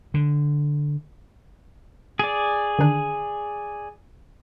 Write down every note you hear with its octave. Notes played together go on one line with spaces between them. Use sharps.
D3
G#4 D5
D3 D#3 D4